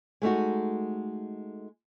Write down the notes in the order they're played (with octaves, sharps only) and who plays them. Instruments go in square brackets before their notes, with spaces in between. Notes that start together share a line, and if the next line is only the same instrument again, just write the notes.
[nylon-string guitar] G#3 A3 D#4 F#4